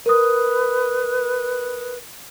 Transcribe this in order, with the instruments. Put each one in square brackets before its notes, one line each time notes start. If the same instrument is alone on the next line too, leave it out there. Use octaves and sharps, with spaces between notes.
[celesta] A#4 D#6 [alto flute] B4